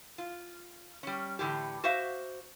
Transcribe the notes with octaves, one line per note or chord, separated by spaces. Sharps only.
F4
G3 C#4
A2 D3 E3 G4
F#4 C5 E5 F5